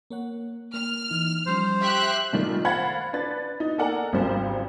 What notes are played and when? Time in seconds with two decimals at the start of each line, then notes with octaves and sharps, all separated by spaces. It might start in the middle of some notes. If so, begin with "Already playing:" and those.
0.10 A#3 C#5 F#5
0.74 A#3 F6
1.10 E3 D#4
1.46 F3 G3 C#4 C5
1.81 G4 E5 F5 C#6 F#6
2.33 A#2 D#3 G3 A3
2.65 C5 F5 F#5 B5 G#6 A6
3.13 D4 B4 A6
3.60 D#4
3.78 A4 A#4 D5 F#5 G#5 A#5
4.13 G#1 C#2 C#3 G3 C5